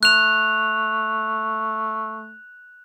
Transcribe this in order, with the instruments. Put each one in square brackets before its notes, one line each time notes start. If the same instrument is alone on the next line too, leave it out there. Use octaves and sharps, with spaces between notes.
[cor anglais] A3 [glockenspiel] F#6 F7